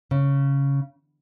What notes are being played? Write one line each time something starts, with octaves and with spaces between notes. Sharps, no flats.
C#3